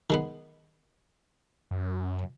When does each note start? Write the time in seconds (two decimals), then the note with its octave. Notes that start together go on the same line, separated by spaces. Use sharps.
0.10 D#3 G#3 B3
1.71 F#2